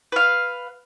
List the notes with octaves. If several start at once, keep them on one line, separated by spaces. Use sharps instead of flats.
B4 F5